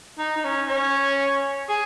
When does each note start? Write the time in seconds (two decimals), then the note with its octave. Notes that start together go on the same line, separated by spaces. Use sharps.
0.19 D#4
0.36 D#4
0.44 C#4
0.68 C#4
1.69 G#4